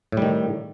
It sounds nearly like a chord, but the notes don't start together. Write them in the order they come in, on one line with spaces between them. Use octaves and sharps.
A2 G3 D#3